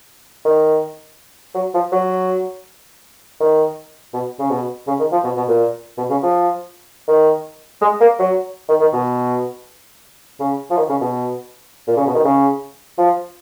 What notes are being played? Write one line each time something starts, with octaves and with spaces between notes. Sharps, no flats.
D#3
F#3
F3
F#3
D#3
B2
C#3
B2
C#3
D#3
F3
B2
B2
A#2
B2
C#3
F3
D#3
G#3
A#3
F#3
D#3
D#3
B2
C#3
F3
D#3
C#3
B2
A#2
C#3
B2
D#3
C#3
F3